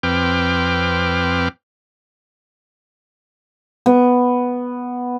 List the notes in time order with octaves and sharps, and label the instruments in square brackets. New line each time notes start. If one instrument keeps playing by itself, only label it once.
[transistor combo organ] F2 C4 B4 G5 D6 F6
[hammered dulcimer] B3